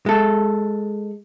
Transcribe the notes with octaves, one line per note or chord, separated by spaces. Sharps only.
G#3 A4